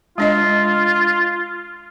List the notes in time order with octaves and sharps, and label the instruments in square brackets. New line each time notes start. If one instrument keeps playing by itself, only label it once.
[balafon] G#3 D4 D#5 [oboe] F4